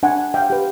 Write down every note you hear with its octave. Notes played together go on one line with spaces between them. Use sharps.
D4 F#5 G#5
F5 G5
G4 B4